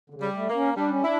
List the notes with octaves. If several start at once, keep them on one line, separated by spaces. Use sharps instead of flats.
D3
C#3
G3
A3
A#3
C#4
G3 D4
C#4
D4 E4